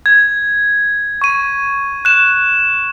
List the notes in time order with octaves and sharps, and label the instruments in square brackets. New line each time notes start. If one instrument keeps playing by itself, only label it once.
[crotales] G#6
C#6 D#7
F#6 E7